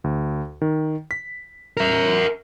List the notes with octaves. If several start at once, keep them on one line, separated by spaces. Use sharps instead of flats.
D2
D#3
B6
A#4 E5